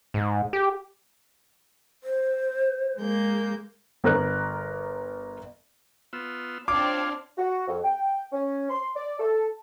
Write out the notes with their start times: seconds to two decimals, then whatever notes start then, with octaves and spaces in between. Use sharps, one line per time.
0.14 G#2
0.53 G4
2.04 C5
2.98 G#3 A#3 G6
4.04 G1 A#4 F#6
6.13 B3 F4 E6
6.68 C4 D4 F4 C#5 F5 D6
7.38 F#4
7.68 F2
7.83 G5
8.32 C#4
8.70 C6
8.96 D5
9.19 A4